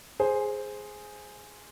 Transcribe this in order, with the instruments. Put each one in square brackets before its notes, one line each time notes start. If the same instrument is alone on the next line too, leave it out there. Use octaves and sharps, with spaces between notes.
[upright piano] G#4 C5